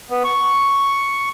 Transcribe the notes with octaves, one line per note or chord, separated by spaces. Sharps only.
B3
C#6